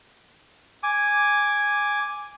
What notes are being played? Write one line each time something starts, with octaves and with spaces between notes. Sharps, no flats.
G#5 D6